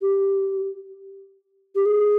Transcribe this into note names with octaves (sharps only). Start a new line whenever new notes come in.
G4
G4
G#4